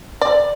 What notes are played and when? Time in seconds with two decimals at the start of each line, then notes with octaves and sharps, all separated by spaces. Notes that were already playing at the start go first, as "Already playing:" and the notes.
0.21 D5